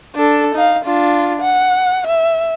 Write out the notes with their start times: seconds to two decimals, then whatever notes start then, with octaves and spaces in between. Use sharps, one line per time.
0.15 D4 A4
0.55 D#4 F5
0.85 D4 F4
1.41 F#5
2.07 E5